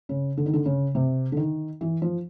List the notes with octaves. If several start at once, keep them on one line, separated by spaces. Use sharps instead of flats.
C#3
D3
D#3
D3
C#3
C3
D3
D#3
E3
F3